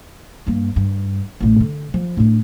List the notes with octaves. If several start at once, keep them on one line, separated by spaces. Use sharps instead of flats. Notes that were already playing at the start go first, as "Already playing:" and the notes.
G2 A#3
G2
A1 A2
D3
F3
A2 D4